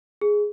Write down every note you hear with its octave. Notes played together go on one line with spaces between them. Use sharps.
G#4